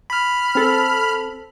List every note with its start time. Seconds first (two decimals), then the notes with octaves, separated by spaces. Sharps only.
0.10 B5 F6
0.55 C4 A4